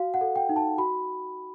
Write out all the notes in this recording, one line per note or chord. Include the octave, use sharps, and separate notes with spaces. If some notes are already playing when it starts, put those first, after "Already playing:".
Already playing: F#4 F5
F#5
A4
G5
D#4
A5
F#4 B5